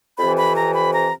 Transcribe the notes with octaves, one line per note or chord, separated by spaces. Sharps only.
F2 C3 E3 B5
B5
A#5
B5
A#5